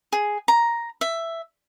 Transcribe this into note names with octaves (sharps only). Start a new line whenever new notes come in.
G#4
A#5
E5